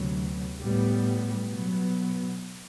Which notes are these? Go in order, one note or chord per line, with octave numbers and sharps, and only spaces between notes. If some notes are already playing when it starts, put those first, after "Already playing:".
Already playing: D2 C3 F#3 B3
A2 G3 B3
B2 F#3 B3